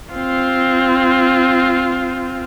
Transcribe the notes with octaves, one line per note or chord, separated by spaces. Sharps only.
C4 F4